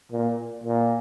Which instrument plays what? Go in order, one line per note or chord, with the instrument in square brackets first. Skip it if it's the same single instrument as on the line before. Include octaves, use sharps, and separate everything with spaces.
[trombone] A#2
A#2